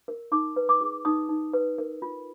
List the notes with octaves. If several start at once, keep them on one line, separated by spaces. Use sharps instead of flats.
A#4
D#4 D6
B4
D6
G#4
D#4 D#6
D#4
B4
A#4
F4